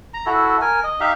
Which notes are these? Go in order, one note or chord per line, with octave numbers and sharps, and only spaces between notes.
A#5
E4 F#4 A4
A#4 G#5
D#5
D#4 G4 E5 F5